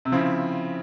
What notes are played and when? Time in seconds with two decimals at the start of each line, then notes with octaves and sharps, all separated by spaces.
0.05 C3
0.12 C#3 F3 C4 E4